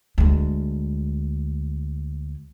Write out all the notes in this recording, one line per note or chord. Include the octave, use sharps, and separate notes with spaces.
D2 G#3